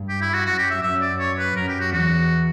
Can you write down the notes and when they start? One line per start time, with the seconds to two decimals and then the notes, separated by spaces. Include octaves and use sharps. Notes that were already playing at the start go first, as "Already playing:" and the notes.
Already playing: G2
0.09 G4
0.22 E4
0.34 F#4
0.46 F#2 F#4
0.58 G4
0.70 E5
0.83 F#2 E5
1.01 D5
1.19 C#5
1.38 B4
1.56 F#2 A#4
1.68 G4
1.80 F#4
1.93 E2 F#4